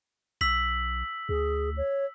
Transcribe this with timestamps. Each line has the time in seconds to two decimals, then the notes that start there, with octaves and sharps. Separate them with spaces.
0.41 B1 E6 B6 F#7
1.29 D2 G#4
1.77 C#5